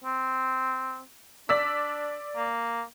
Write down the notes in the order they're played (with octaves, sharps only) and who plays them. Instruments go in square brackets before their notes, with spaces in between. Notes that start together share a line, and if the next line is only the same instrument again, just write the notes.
[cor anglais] C4
[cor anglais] D4 [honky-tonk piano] D5 E6 B6
[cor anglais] A#3